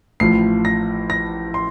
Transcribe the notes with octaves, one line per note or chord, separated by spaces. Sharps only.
A1 A2 F3 C7
A#6
A#6
C6